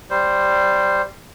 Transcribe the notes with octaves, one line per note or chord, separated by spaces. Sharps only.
G3 C5